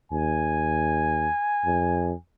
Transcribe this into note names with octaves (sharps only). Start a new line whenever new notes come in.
D#2 G#5
F2